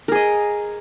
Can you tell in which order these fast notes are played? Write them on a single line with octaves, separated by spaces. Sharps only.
A#4 G#4 D#5